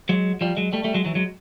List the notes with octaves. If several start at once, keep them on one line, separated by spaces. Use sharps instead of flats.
F#3 G#3
F3 G3
F#3 G#3
G3 A3
G3 A3
F#3 G#3
E3 F#3
F#3 G#3